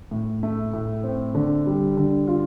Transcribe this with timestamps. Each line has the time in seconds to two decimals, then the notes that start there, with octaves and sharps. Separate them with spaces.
0.11 A2
0.43 A3
0.74 A2
1.04 C4
1.35 D3
1.67 G3
1.97 D3
2.27 F4